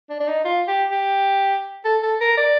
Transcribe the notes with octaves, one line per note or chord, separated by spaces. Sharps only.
D4
D4
D#4
F4
G4
G4
A4
A4
A#4
D5